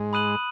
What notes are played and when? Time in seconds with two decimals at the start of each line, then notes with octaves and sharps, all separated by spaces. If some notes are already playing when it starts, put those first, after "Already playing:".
Already playing: G#2 G#3
0.13 B5 D#6 F#6 D#7 F#7